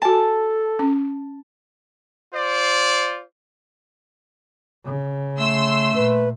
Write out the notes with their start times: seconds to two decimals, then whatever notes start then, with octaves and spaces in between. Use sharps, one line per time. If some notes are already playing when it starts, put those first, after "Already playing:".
0.02 F#4 A4 G#5 A5
0.79 C#4
2.34 F4 C5 D5
4.84 C#3
5.38 A3 C6 E6
5.95 A#2 B4